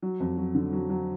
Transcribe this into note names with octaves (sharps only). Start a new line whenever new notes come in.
F#3
F2
F#3
D3
F#3
F#3